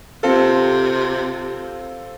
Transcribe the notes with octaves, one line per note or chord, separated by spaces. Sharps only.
C3 C4 F4 A4